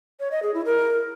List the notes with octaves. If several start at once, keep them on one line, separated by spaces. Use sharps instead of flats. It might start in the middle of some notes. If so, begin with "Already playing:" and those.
C#5
D#5
G#4
E4
A#4